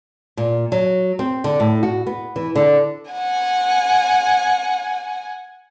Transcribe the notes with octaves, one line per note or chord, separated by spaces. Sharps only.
A#2
F#3
C4
D3
A2
F#4
B3
E3
D3
F#5 G#5